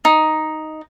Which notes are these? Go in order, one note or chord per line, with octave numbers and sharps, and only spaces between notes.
D#4